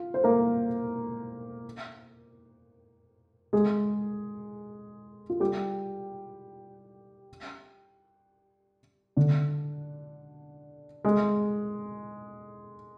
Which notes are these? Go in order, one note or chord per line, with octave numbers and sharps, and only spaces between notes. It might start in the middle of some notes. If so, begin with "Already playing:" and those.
Already playing: F4 F5
C5
A#3 A#4
G#3 G#4
F4
G3 G4
D3 D4
G#3